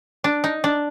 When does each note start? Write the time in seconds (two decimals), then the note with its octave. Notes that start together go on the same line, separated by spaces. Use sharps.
0.24 D4
0.44 D#4
0.64 D4